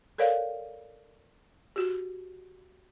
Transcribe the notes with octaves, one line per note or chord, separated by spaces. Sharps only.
A4 A#4 C#5 D5 F5
F#4 G4